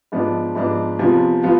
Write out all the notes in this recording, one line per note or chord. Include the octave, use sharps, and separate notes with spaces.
G#2 F3 B3 D4
G#2 F3 B3 D4
E2 C3 F3 B3 F4
F3 B3 F4